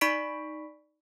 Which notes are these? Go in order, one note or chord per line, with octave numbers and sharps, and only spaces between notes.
D#4 D5 B5 C#6 B6 D7